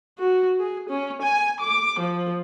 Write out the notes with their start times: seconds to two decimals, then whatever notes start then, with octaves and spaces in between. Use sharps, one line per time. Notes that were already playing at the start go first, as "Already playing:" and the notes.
0.19 F#4
0.60 G#4
0.89 C#4
1.22 G#5
1.60 D6
1.99 F3